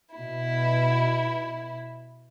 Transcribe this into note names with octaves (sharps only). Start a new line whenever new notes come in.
B2 E4